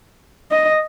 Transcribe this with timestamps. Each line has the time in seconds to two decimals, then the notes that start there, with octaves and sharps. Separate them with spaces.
0.51 D#5